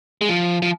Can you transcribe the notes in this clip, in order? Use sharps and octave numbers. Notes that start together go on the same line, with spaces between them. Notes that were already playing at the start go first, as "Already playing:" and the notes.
G#3
F3
F3